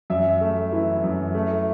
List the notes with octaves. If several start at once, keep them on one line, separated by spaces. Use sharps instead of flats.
F#2 E5
A3
E3
F#2
A3